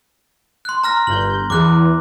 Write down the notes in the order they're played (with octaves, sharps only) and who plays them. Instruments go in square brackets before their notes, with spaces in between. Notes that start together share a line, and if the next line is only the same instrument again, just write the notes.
[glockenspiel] C6 F#6
A#5 F6 A#6
[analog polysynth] G1 G6 [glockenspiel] F#7
[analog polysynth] E2 [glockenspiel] D6 F#6